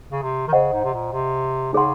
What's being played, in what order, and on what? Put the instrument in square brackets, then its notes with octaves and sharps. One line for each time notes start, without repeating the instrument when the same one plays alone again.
[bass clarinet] C#3
C3
D#3
[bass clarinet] C#3 [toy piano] C5 D#5 F#5
[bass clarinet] G#2
C3
A#2
C3
[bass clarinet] C#3 [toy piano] D#4 G#4 C#5 F#5 C6